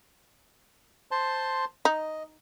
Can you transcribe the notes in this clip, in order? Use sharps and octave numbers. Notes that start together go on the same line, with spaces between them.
C5 A5 C6
D#4 D#5